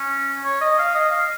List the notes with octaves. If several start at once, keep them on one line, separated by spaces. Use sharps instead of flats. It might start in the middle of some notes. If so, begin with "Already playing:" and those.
Already playing: C#4
C#5
D#5
F5
D#5
F5